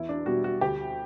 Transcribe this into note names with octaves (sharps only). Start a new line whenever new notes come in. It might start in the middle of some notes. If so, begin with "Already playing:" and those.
Already playing: E2 E4
D4
B2 G3 F#4
F#4
D2 G4